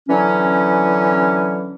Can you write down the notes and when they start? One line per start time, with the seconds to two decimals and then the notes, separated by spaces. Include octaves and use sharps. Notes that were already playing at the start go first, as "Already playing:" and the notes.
0.09 D3 E3 F#3 C#4